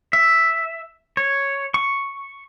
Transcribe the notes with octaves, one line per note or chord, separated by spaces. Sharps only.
E5
C#5
C#6